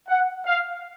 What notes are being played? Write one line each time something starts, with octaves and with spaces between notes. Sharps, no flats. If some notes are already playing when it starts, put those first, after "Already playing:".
F#5
F5